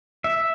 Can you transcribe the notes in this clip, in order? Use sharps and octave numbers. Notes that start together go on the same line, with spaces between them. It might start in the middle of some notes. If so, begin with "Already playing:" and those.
E5